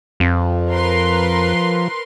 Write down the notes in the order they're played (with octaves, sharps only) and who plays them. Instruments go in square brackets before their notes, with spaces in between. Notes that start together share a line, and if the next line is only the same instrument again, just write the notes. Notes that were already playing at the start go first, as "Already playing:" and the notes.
[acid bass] F2 [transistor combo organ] F3
[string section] A#4 B4 C6